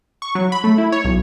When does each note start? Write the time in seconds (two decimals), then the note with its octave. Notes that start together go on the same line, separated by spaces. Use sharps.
0.22 C#6
0.35 F#3
0.52 B5
0.64 A3
0.78 E4
0.92 C#5
1.04 B1